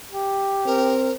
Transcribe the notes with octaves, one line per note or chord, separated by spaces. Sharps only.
G4
C4 A#4